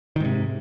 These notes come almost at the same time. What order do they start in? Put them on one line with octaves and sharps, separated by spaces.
D#3 G#2 C3